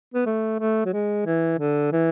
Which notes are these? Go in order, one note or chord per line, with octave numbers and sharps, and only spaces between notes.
B3
A3
A3
F#3
G#3
E3
D3
E3